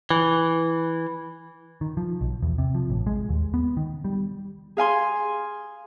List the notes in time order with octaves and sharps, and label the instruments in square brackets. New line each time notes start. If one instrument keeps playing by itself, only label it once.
[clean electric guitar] E3
[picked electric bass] D#3
F3
B1
E2
C3
F3
A1
G#3
D#2
B3
D#3
G3
[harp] G#4 F5 G#5 C6